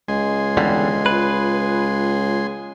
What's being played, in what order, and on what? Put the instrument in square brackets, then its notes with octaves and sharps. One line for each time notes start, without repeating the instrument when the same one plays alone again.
[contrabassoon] C#2 [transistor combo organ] G#3 G#5 C6 [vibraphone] D#5
[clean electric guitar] E2 D3 G3
[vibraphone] F4 C#5 [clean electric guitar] B4